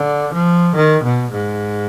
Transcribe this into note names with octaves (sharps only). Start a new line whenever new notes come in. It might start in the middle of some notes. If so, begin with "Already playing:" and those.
Already playing: D3
F3
D#3
B2
G#2